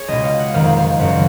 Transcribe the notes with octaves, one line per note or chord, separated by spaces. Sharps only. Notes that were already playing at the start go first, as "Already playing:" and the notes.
Already playing: G#4 C#5
C#2 B2 D#5
F5
F#5
F#1 F2 D#3 F5
F5
F#1 F#2 C#3 F#5